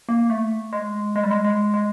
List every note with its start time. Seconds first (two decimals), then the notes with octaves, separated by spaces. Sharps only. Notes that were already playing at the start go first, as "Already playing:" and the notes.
0.09 A#3
0.30 A3
0.73 G#3
1.16 G#3
1.23 G3
1.31 G#3
1.44 G#3
1.74 G#3